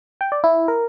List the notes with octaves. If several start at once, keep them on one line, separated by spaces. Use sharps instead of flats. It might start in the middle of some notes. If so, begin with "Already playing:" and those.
G5
D5
E4
A#4